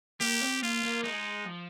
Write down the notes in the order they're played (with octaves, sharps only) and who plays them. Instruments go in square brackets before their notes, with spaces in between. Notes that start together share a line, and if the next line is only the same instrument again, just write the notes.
[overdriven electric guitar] A#3 [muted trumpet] G4
[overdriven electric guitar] C4
[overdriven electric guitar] A#3 [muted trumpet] F4
[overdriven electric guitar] A#3
[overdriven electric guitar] G#3 [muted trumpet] D#4
[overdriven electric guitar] F3